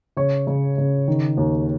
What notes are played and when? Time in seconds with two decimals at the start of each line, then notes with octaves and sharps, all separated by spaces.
0.17 C#3 C#5
0.47 C#3
0.78 C#3
1.08 D#3
1.37 D#2